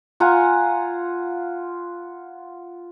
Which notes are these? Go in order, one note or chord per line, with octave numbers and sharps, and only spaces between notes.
F4 F#5 G#5 A#5